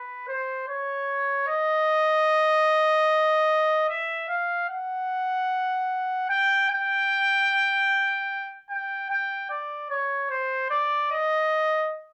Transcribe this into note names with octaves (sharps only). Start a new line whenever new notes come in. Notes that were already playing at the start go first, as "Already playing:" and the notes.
Already playing: B4
C5
C#5
D#5
E5
F5
F#5
G5
G5
G5
G5
D5
C#5
C5
D5
D#5